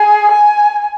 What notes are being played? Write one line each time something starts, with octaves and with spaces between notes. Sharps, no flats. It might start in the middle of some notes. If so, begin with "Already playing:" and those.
Already playing: G#4
G#5